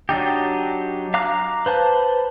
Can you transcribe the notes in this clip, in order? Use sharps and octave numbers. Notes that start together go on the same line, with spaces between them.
F#3 D4 D#4 G4
F5 A#5 D6 F#6
B4 C5 A5